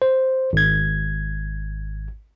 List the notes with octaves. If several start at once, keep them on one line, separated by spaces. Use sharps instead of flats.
C5
G#1 G#6